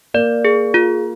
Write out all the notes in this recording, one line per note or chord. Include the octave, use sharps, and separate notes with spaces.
A#3 D5
G#4
F4